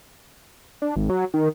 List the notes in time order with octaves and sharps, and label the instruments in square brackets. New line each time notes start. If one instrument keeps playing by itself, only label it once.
[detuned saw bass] D4
G#1
F#3
D#3